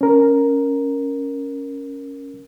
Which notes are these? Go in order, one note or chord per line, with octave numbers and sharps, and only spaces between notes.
C#4 A#4